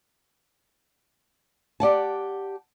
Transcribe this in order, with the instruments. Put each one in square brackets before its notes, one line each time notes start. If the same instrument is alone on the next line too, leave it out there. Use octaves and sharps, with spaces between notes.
[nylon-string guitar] G4 D5 F#5 A5